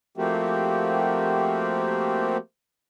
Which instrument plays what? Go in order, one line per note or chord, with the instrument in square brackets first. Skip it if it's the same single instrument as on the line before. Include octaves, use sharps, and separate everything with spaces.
[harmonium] F3 A3 A#3 C4 F#4 G4